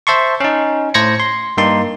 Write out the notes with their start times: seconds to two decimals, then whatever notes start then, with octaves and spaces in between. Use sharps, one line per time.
0.07 C5 E5 A5 C6 C#6
0.40 C#4 D#4
0.94 A2 C5 G#6 A#6 C#7
1.20 C6
1.57 G2 A#3 D#4 C6